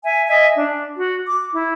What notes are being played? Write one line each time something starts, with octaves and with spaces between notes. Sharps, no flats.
E5 G#5
D#5 E5 G#5
D4
F#4
D6
E4